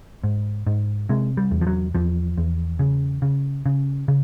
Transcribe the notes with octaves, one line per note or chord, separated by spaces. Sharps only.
G#2
G#2
C3 G#3
G3
E2
F3
F#3
E2 F3
E2
C#3
C#3
C#3
C#3